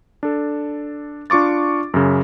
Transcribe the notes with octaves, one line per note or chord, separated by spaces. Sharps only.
D4 A4
D4 F4 C#6 D6 A6
F#2 C#3